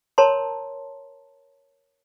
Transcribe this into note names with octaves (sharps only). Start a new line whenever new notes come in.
A#4 C#5 A5 A#5 C6